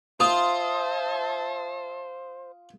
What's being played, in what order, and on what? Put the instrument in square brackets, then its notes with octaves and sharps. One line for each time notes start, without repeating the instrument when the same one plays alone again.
[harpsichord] F4 [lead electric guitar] C5 [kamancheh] E5 A5 [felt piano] D#6